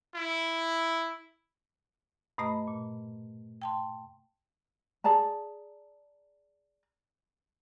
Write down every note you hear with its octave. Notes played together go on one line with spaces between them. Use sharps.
E4
G2 B2 A3 D#5 A#5 B5
A#2
G5 A5 C6
G#4 D5 A5 A#5